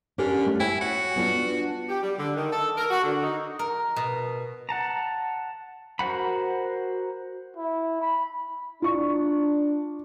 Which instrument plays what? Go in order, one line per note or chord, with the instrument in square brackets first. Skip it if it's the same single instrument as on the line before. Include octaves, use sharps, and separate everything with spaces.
[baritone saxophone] D3 [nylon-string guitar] C#4 G4 A#4
[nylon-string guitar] A3
[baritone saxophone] E4 [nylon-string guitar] C#5 G5 G#5
[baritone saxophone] F#4
[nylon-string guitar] B3 D4 F4
[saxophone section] G4
G3
D3
D#3
A4
A#4
F#4
D3
D#4
[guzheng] A#4
B2
[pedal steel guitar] F#5 A5 A#5
F#4 A#4 C5 F#5 B5
[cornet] E4
B5
[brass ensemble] D4 [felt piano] F4 C#6